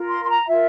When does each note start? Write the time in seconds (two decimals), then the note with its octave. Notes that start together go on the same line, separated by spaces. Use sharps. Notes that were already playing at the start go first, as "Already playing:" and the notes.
Already playing: F4 A#4
0.09 C6
0.24 C6
0.28 A#5
0.47 F4 A#4 E5